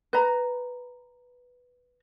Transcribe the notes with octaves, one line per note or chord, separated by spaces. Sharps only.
B4 A#5